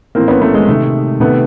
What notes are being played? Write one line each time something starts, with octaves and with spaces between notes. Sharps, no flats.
A2 E3 A#3 C4
B3 C#4
A3 B3
G#3
C3 D#3 A3
C3 D#3 A3 B3